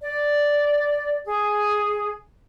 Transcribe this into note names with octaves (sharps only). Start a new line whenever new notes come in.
D5
G#4